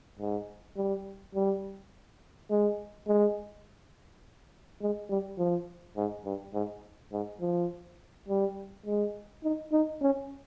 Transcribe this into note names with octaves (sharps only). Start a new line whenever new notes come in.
G#2
G3
G3
G#3
G#3
G#3
G3
F3
G#2
G2
G#2
G#2
F3
G3
G#3
D#4
D#4
C#4